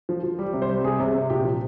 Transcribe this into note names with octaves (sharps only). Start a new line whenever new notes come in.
F3
F3
G3
C3
C5
G3
C3 G#4
C3
C3
A#2 G4
F3